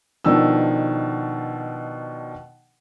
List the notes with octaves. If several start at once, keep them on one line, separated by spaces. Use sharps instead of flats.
B2 D#3 F3 D4 E6